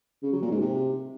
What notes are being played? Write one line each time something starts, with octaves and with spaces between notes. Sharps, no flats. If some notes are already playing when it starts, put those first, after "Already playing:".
C#3
F#3
A#2
G#2
C3